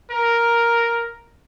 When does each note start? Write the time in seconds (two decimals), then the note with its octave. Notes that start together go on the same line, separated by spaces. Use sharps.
0.11 A#4